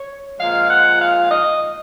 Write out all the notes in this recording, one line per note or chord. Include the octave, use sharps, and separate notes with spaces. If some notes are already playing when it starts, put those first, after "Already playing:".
Already playing: C#5
A#2 F3 G#3 F5
F#5
F5
D#5